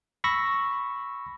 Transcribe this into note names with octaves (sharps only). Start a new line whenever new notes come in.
B5 C#6 E6 A#6